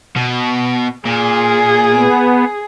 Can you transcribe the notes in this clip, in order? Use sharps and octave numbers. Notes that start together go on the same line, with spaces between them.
B2
A#2 G#4
B3